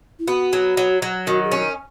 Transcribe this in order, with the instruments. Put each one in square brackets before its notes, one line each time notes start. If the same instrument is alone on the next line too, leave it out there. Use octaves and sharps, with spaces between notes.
[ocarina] E4
[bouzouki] B3 [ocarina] F#4
[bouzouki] F#3
F#3
F#3
[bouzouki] D#3 [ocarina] F#4
[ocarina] G#4
[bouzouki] C#4
[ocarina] A#4